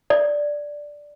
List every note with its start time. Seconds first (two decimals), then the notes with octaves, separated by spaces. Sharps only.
0.10 D5